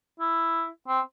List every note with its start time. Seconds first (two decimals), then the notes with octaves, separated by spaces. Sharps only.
0.20 E4
0.88 C4